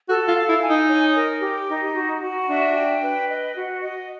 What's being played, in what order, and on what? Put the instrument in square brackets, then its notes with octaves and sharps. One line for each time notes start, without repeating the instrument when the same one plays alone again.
[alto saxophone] F#4 [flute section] A4
[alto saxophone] F4
[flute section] F5
[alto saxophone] E4
[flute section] G#5
[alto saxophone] D#4
[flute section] C#5
A#4
G4
D#4
F#4
F#4
[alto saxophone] D4 [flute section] E5
[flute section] G5
B4
D#5
F#4
D#5